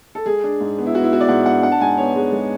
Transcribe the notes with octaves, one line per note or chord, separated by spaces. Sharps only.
A4
G#3 G#4
D4
G#2
B3
E4
B3 F#4
E4
B3 F#4
D5
G#2 F#5
D4 F#5
D4 F#5
A5
G#2 G#5
B3 C#5
G#3
G#3